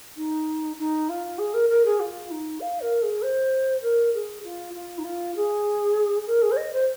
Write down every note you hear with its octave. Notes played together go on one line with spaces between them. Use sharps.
D#4
D#4
F4
G#4
A#4
A#4
G#4
F4
D#4
F5
A#4
G#4
C5
A#4
G#4
F4
F4
D#4
F4
G#4
A#4
G#4
C5
D#5
C5